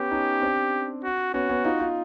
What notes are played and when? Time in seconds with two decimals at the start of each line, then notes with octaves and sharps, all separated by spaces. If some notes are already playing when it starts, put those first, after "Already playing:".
Already playing: B3 C#4 G4
0.11 C#4 D#4
0.42 C4 D4
1.04 F#4
1.34 B3 C#4 F#4
1.49 B3 C#4
1.65 D#4 F4
1.79 D#4 F4